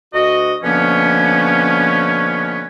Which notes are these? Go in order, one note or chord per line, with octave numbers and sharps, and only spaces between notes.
D2 F#4 D#5
B2 D3 F3 A#3 B3 C#4